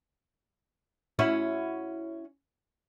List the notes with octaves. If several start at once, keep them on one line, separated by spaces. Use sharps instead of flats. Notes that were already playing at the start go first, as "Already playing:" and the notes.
C#4 E4 F#4